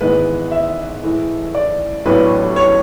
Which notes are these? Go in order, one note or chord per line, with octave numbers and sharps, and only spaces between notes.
G#1 G#2 E3 G#3 B3 B4
E5
A2 E3 G#3
D5
A1 A2 F#3 B3 D4 B4
C#5